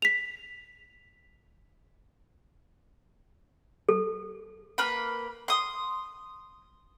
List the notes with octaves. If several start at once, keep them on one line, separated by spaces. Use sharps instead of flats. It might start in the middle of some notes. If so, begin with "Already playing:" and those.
B6 F7
A4
A#3 B4 B5
C6 D#6